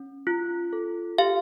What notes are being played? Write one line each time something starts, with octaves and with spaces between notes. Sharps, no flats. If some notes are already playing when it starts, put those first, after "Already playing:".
Already playing: C#4
F4
A4
G4 F5